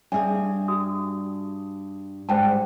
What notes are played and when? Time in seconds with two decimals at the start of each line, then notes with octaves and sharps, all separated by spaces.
0.12 G2 D4 G#4 E5 G#5
0.68 F#4 D#6
2.29 G#2 G3 C5 G5 A5